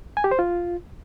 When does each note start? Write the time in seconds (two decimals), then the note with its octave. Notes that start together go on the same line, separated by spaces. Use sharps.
0.17 G#5
0.24 G4
0.31 C5
0.39 F4